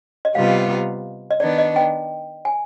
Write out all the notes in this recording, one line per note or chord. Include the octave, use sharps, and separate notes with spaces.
D#5
C3 G3 B3 F4 F5
D#5
D#3 B3 D4 D5
D#5
G5
G#5